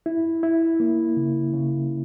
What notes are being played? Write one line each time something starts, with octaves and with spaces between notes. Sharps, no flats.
E4
E4
A#3
C#3
C#3